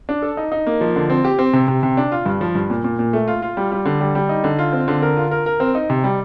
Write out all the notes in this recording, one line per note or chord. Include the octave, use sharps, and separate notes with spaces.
D4
A4
D#4
D#4
A#3
F3
D3
C4
G4
C4
C3
C3
C3
D4
F4
G2
F3
G2
A#2
A#2
A#2
A3
F4
F4
G3
G3
D3
G3
G3
D#4
D3
F4
C4
D3
A#4
F4
A#4
A#4
C4
D#4
C3
G3